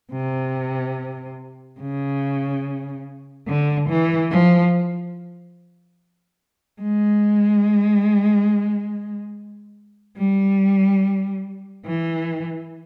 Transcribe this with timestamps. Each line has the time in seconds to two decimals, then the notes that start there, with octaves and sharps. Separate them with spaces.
0.12 C3
1.80 C#3
3.48 D3
3.89 E3
4.31 F3
6.82 G#3
10.17 G3
11.85 E3